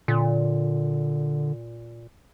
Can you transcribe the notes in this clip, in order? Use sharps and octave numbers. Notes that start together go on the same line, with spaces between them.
A#2 D3